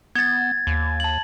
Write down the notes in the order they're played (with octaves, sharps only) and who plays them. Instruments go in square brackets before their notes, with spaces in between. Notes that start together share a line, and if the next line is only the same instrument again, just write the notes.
[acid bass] B3 [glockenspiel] G#6 A6
[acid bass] D#2
[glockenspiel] A5 F#7